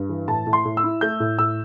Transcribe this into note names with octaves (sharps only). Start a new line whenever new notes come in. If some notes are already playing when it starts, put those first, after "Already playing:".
Already playing: G2
E3
A2 A5
A2
C6
A2
E6
E4
A3 G6
A2
A2 E6